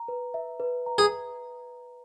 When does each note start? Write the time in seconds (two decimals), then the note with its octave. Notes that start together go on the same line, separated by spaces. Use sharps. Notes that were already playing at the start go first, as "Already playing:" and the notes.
Already playing: A#5
0.08 B4
0.34 E5
0.60 B4
0.86 A#5
0.98 G#4